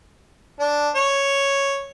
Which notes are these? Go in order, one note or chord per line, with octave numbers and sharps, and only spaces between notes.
D4
C#5